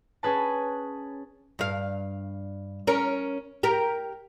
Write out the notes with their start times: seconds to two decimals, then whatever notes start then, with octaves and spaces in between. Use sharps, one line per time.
0.23 C#4 G#4 B4 A5
1.59 G2 F5
2.87 C#4 A#4
3.63 G4 A#4